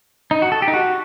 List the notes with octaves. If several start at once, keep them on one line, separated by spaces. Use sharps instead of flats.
D#4
F#4
A4
G4
D#4
F#4